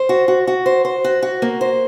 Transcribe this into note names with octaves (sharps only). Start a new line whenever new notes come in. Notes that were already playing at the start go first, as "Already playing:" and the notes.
Already playing: C5
F#4
F#4
F#4
C5
C5
F#4
F#4
A#3
C5